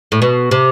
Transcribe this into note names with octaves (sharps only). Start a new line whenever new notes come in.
A2
B2
C3